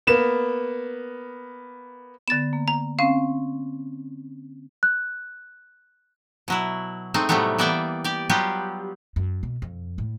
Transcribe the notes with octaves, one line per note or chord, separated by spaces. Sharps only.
A#3 B3 E7
D3 B3 A6 E7
A#3
A#5
C4 C#4 F5
F#6
B2 F#3 E4
G#3 A3 C4 D#4
A2 C3 F#3 G3 A3 B3
E3 A#3 B3 D5 E5 G5
G4 D5
F#3 G3 B3 F4 G4
F#2
B2
F2
A2